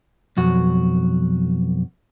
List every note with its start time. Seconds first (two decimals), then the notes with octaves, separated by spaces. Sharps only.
0.37 B1 F2 F#4